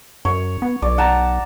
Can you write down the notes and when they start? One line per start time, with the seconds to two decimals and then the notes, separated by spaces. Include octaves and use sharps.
0.25 F#2 C#5
0.62 B3
0.82 B1 D5
0.98 F#5 A5 A#5